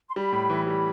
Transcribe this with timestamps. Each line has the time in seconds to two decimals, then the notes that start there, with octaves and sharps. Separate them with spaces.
0.08 C6
0.15 G3 B5
0.33 A2
0.50 E3
0.67 G3 B5